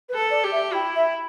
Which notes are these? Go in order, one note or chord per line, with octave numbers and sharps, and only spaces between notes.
B4
A4
D5
G4
E5
E4 G5
E5